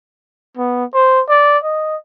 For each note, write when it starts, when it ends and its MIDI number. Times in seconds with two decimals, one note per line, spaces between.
0.57 0.85 59
0.94 1.22 72
1.29 1.58 74
1.64 1.96 75